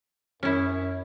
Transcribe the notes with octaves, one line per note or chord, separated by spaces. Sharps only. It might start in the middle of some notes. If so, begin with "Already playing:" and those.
F#2 C#4 E4